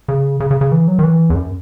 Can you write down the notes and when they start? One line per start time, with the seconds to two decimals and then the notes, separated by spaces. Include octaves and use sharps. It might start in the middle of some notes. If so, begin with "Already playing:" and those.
0.08 C#3
0.40 C#3
0.51 C#3
0.61 C#3
0.72 E3
0.88 F#3
0.99 D#3
1.03 E3
1.30 E2
1.35 F#2